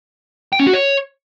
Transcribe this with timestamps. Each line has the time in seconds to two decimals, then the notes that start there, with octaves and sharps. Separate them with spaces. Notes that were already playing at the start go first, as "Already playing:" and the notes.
0.53 G5
0.60 C#4
0.67 F#4
0.73 C#5